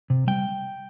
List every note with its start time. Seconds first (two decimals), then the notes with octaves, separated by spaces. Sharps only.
0.10 C3
0.27 G3 G5